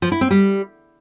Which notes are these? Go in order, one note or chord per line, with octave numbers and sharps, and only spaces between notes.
F3
E4
C4
G3